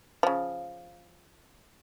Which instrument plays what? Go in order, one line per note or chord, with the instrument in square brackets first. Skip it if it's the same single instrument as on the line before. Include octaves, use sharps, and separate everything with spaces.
[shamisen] C#3 F3